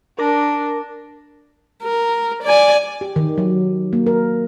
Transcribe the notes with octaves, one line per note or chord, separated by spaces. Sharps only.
D4 A#4 D6 A#6
A#4
D5 G#5
G4
D#3
F#3
A#3
A#4